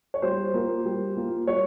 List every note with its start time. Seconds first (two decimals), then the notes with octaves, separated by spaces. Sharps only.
0.14 C#5
0.22 G3 C5
0.54 A#3 F4 A#4
0.86 G3
1.17 A#3 F4 A#4
1.47 G3 C#5